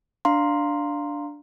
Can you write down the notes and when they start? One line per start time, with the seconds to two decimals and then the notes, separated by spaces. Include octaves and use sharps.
0.25 D4 F5 A#5 C6